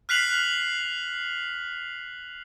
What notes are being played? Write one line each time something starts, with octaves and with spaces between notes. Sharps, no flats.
F6 F#6 B6 C7 F7 F#7